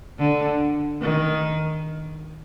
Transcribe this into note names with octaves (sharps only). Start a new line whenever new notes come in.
D3
D#3